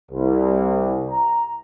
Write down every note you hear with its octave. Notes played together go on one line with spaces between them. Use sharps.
C2
A#5